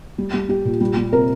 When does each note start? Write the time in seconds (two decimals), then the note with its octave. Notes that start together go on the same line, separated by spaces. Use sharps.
0.18 G3
0.34 G3
0.49 G3 G4
0.65 A#2
0.81 G3
0.97 G3
1.12 C3 A#4